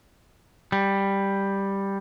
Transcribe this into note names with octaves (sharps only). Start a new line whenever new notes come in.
G3